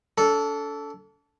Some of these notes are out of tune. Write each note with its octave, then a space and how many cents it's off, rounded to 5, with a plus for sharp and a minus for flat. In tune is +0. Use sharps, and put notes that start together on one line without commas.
D4 -45 A4 +0